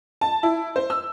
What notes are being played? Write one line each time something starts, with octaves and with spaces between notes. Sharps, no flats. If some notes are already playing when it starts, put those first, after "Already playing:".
A5
E4
C5
E6